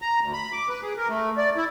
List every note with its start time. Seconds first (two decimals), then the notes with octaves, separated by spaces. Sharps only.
0.02 A#5
0.21 D2
0.33 B5
0.52 D6
0.69 B4
0.82 G#4
0.97 A#4
1.09 A3
1.37 D5
1.56 E4